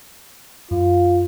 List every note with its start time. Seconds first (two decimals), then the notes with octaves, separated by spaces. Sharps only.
0.71 F#2 F4